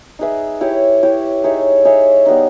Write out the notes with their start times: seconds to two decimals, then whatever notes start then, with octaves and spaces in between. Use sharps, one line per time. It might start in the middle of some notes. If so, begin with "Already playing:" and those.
0.19 D#4 G#4 B4 E5
0.61 E4 G4 C#5
1.02 E4 G4 C#5
1.44 D#4 G#4 C#5 E5
1.85 D#4 G#4 C#5 E5
2.26 G3 B3 D#4